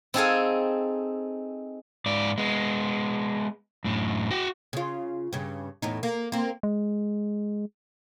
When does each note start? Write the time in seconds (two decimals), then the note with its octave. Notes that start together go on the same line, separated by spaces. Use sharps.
0.14 C4 D#4 G#4 A4 F5 G#5
2.06 G#2 D5
2.38 G#3 B3
3.84 F#2 A2
4.31 F#4 G5
4.73 C#3 F4
5.33 G2 C#3
5.82 E2 A2 D#4
6.03 A#3
6.32 A#3 C4
6.63 G#3